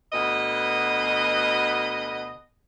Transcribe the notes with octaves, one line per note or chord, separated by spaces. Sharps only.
D2 B2 B4 D#5